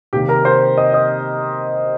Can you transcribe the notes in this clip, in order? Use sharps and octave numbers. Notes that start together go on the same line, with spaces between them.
C3 D#3 A#3 G4 G5
A#4 A#5
C5 C6
D#5 D#6
D#5 D#6